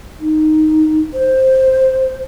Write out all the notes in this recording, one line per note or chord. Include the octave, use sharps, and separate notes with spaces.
D#4
C5